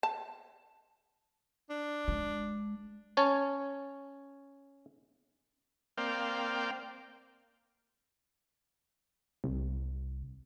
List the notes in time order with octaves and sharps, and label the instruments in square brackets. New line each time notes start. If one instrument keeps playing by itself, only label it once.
[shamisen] A5
[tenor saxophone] D4
[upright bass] G#3
[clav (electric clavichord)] C#4 C#5 A5
[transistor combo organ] A#3 C4 D5 F5 G5
[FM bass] C2